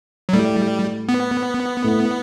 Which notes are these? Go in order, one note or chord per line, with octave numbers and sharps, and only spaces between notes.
F#3
A2 G3 A3
B3
A2 A3